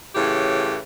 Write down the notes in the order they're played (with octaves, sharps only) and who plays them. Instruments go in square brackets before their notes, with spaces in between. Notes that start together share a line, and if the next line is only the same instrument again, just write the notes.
[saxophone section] A2 C#3 E3 G4